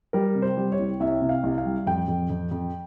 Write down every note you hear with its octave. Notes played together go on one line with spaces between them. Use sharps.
G3 A#4
C3
C5
G3
C#5
C2
C2 E5
C3
F5
C2
F5
G3
F2 G5
F2
F2
F2